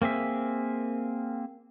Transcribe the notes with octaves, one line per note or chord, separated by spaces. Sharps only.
A#3 C4 G#4 E5